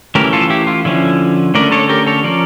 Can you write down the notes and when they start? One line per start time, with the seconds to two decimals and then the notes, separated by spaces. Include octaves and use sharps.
0.15 E3 A3 C#4 G4 A#4
0.33 F4 A4
0.50 E4 G4
0.67 F4
0.85 D3 F3 C#4 E4
1.54 D3 A3 C#4 A#4 D5
1.72 A4 C#5
1.89 G4 A#4
2.07 A4 C#5
2.24 F3 C#4 A#4 D5